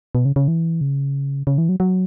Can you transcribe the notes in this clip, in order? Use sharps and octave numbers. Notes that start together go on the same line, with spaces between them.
B2
C#3
C#3
E3
C#3
C#3
E3
F#3
F#3